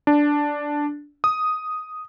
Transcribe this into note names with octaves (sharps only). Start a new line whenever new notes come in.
D4
D#6